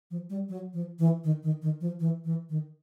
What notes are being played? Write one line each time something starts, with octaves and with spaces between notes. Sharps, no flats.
F3
G3
F#3
F3
E3
D#3
D#3
D#3
F3
E3
E3
D#3